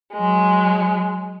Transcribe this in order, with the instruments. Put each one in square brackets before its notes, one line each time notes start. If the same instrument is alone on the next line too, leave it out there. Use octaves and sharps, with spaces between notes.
[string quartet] F#3 G#3